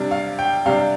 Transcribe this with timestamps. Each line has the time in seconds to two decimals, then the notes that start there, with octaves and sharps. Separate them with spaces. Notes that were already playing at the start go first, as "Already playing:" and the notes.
Already playing: C3 G3 D4
0.11 F5
0.39 G5
0.66 C3 G3 D4 F5